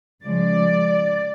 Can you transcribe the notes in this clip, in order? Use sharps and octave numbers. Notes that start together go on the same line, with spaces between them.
C#3 F3 G#3 D5